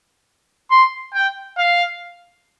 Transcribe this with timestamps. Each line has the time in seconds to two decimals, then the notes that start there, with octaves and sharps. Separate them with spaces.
0.71 C6
1.14 G5
1.58 F5